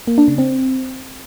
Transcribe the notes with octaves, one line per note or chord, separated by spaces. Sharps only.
A#3
D4
C#3
C4